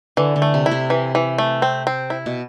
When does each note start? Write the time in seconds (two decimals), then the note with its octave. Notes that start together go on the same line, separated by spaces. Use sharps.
0.17 D3 E3
0.36 D3
0.42 A3
0.54 C3
0.66 E4
0.71 C3
0.90 E3
1.15 E3
1.38 A3
1.62 C4
1.87 C4
2.10 E4
2.26 B2